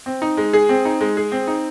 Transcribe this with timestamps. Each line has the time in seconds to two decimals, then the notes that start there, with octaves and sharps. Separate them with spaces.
0.06 C4
0.22 D#4
0.37 G#3
0.53 G#4
0.69 C4
0.85 D#4
1.01 G#3
1.17 G#4
1.32 C4
1.48 D#4